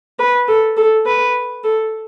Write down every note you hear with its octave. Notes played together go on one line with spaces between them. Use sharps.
B4
A4
A4
B4
A4